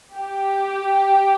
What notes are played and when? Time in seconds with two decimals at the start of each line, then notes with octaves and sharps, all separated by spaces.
0.15 G4